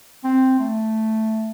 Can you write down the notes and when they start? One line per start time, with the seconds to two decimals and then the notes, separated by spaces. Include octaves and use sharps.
0.24 C4
0.60 A3